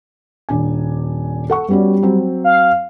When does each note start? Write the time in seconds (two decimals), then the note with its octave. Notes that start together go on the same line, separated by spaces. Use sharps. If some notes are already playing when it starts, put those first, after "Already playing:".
0.49 D#1 D4 G#5
1.50 A4 F#5 C#6
1.69 G3 B3 C#4 F#4
2.02 F#3 C4
2.44 F5